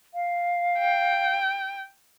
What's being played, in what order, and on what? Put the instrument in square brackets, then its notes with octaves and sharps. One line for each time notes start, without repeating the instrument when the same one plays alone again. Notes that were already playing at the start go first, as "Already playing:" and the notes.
[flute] F5
[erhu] G5